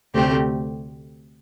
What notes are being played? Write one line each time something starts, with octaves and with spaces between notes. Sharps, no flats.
D2 C3 A3 C4 G4